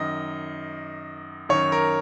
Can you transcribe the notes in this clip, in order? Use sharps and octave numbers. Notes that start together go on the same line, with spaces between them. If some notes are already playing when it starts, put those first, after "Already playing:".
Already playing: F#2 D#3 D#5
F#2 D#3 C#5
A#4